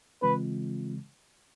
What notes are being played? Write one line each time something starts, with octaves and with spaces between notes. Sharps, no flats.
C#3 E3 G#3 C4 F4 B4